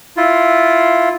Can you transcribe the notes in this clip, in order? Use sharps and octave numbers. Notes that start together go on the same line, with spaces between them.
E4 F4